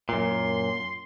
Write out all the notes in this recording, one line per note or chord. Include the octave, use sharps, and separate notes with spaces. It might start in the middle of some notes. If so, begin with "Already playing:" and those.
F#2 A#2 C6